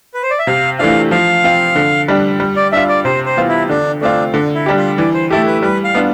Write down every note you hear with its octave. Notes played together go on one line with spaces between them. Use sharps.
B4
C5
D5
E5
C3 F5
E3 A3 D4 F4 F5
F3 F5
C4 F4
D3
G3 D4
G3
D5
D4 F4 E5
D5
C3 C5
C5
E3 B3 F4
E4
D3 D4
A3 C4 D4 F4
D3 D4
E4
G3 D4 G4
F4
E3 D5
C5
A3 E4 G4 A4
B4
G3 B4
F5
B3 D4 F4